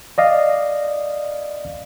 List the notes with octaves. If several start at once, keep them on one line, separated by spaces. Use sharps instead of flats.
D5 D#5 F5